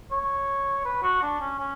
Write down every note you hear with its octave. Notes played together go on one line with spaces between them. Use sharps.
C#5
B4
F#4
D4
C#4
C#4